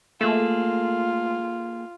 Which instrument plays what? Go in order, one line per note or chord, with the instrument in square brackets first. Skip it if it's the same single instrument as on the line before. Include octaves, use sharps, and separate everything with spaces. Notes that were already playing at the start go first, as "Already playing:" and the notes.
[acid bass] A3 [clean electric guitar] A#3 G#4 A4 [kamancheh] F4